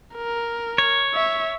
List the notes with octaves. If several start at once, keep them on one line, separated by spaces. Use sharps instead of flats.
A#4
C#5
E5